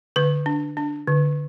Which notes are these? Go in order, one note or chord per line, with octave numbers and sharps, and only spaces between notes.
D3 B4
D4
D4
D3